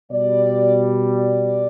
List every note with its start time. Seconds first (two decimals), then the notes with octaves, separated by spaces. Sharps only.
0.11 B2 G3 D5
1.19 D5